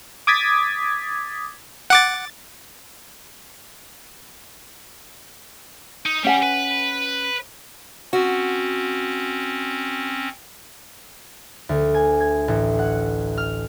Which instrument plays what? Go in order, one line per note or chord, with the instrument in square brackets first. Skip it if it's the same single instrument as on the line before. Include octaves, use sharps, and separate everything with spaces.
[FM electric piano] D6 D#6 G#6 A6 B6
[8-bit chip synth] F#5 D6 A6
[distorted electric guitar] D#4
[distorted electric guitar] G3 G4 [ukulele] C#4 F#5 G#5
[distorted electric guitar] B4
[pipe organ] C4 C#4 [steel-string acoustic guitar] F#4
[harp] D2
G#5
G#6
A1
F#5
F6